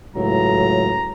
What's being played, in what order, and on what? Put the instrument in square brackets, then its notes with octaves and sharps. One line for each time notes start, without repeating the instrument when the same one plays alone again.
[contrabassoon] C#2 [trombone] A2 [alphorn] F#3 [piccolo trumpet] A#5